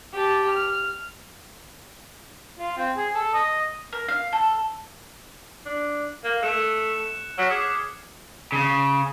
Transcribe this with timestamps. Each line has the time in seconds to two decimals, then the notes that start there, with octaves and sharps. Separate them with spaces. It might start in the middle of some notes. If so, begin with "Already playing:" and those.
0.13 G4 A5
0.49 F6
2.59 F4
2.77 C4
2.97 G#4
3.15 A4
3.34 D#5
3.93 A#4
4.08 F5
4.33 A4
5.65 D4
6.24 A#3
6.43 A3 F#6 C#7 E7
7.38 F#3 F6 B6 C7
7.50 G#4 D6 G#6 C#7
8.52 C#3